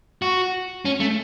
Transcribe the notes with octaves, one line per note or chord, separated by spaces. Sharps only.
F#4
C#4
A3